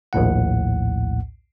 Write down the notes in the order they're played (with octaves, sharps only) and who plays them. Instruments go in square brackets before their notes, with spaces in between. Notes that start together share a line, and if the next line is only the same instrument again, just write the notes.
[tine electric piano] A#1 D#2 A2 F#5